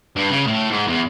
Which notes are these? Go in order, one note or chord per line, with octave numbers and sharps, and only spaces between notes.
G2
C#3
A2
G#2
E2